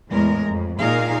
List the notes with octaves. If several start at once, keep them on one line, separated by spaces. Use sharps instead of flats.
E2 A2 G#3 A#4
F2
A#2 D#4 G#4 A#4 F5